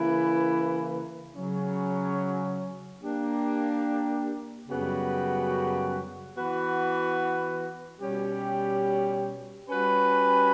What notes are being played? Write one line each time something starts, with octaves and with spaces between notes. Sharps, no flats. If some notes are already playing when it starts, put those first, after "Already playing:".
Already playing: C#3 E3 A#3 E4 B4
C#3 F#3 C#4
A#3 D4 G4
F#2 C#3 G3 B3 F#4
E3 B3 F#4 B4
B2 G3 C#4 G4
G3 C#4 F#4 B4